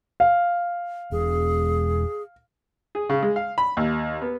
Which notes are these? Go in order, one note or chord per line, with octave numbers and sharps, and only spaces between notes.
F5
E1 G#4
G#4
C#3
G#3
F5
B5
D#2
B3